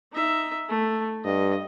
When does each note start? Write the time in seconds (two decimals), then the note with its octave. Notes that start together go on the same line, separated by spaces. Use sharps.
0.13 D#4 E5
0.69 A3
1.25 G2 D#5